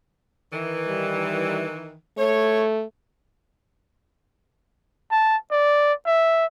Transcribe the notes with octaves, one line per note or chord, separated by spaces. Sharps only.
D#3 E3
G3
A3 C#5
A5
D5
E5